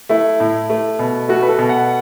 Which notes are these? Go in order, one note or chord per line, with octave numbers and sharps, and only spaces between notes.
A3 E4
A2
A3
B2
A3 F#4
B4
A4
B2
F#5